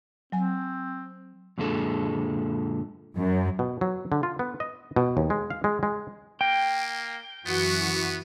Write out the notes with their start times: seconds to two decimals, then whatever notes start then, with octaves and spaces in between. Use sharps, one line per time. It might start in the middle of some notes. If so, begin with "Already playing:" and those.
0.32 F#3 C4 G#5
1.58 F#2 A#2 D3 G#3 A4
3.17 F#2
3.59 B2
3.81 F#3
4.12 D3
4.23 F4
4.39 B3
4.60 D#5
4.96 B2
5.17 D#2
5.30 G#3
5.50 F5
5.64 G#3
5.83 G#3
6.41 A#3 G5
7.46 F#2 E3 B3 F#4